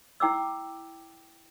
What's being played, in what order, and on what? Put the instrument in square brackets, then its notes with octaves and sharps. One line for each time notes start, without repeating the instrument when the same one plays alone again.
[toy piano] E4 G5 D6 E6